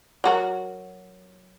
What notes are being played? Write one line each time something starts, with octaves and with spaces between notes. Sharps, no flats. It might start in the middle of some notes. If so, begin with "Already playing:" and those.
F#3 F#4 A#4